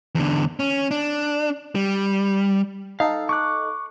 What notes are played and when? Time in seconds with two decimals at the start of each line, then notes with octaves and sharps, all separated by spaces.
0.15 E2 D3
0.60 C#4
0.91 D4
1.75 G3
3.00 D#4 A4 F5
3.29 C#6 D6 F#6